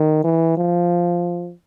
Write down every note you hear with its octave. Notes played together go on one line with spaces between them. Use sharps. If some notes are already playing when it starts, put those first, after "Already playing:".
Already playing: D#3
E3
F3